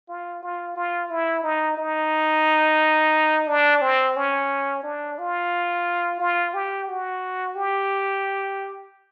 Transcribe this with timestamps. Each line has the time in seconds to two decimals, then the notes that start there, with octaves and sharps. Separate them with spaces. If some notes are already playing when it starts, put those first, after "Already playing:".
0.09 F4
0.43 F4
0.76 F4
1.10 E4
1.44 D#4
1.78 D#4
3.48 D4
3.82 C4
4.17 C#4
4.84 D4
5.18 F4
6.20 F4
6.54 G4
6.89 F#4
7.56 G4